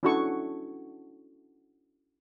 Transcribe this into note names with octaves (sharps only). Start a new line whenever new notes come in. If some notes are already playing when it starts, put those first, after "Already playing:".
C#4 D4 E4 F#4 A4 C#6